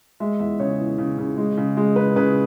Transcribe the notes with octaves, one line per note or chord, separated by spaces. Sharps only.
G#3 E5
E2 E5
C#3 C#5
E3
C#3
C#3
G#3
C#3
G#3
C#3 B4
C#3 B4